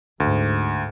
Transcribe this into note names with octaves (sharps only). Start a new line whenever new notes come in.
D2 G#2